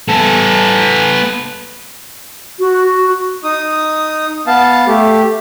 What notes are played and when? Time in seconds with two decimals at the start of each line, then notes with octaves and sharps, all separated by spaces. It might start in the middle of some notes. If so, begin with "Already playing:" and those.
0.08 B3 A4
2.59 F#4
3.44 D#4 D#6
4.47 B3 F5 A5
4.87 A3 G4